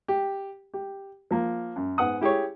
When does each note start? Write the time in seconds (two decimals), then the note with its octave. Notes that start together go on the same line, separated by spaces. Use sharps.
0.08 G4
0.74 G4
1.31 F3 A#3
1.76 F#2
1.98 G#2 B3 F#5 D#6
2.21 E4 G4 G#4 C#5